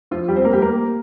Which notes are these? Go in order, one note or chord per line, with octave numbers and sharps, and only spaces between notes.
F3 F4
G3 G4
C4 C5
A#3 A#4
G3 G4
A#3 A#4